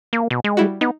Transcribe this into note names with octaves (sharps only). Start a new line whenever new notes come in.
A#3
B2
G#3
G3 E4 F#4
B3 D#4